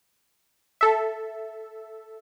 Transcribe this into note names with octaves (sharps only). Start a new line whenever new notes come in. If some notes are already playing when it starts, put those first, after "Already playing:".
A4 E5